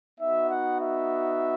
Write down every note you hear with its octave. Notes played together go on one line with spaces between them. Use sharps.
B3 D#4 F#4 E5
F#5
E5